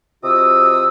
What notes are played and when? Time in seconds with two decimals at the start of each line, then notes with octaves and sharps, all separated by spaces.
0.23 C3 F4 F#4 D#5 D#6 E6